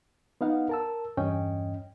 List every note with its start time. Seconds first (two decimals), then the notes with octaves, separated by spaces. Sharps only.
0.41 B3 D#4 F5 F#5
0.69 A#4 A5 E6
1.17 E2 G2 C#4 D#5 G5